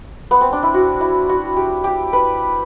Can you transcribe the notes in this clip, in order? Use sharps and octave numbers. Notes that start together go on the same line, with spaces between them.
B3
C4
D4
E4
F#4
E4
F#4
G4
G4
B4